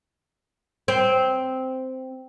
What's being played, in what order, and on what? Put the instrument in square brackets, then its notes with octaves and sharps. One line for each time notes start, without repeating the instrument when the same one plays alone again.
[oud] C4